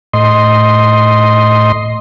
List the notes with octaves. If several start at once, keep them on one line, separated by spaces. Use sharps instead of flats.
A2 D#5 C6